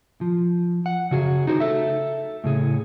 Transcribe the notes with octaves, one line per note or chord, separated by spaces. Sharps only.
F3
F#5
C#3 F#4 G#4
D#4 F#4 C5
A4 E5
A2 C#3 G#4